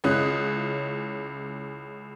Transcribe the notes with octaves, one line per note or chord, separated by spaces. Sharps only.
C#2 C#4 E4 D#6 F#6